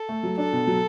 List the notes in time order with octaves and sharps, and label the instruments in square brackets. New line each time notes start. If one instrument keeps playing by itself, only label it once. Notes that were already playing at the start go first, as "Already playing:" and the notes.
Already playing: [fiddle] A4
[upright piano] A3
F#3
[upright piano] D4 [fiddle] A4
[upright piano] B2
F#3